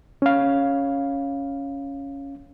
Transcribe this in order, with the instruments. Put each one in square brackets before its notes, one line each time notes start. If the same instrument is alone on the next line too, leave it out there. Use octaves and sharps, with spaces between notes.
[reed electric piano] C#4 F5